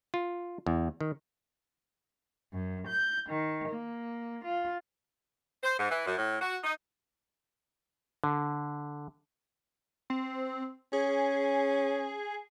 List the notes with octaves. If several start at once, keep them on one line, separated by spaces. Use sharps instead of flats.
F4
E2
D#3
F#2
G6
D#3
A#3
F4
C5
G#2
E3
F#2
A2
F#4
D#4
D3
C4
C#4 G#4